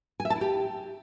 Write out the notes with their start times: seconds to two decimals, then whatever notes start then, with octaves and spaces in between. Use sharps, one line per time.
0.20 G#5
0.25 E5
0.30 A5
0.36 E4
0.41 G4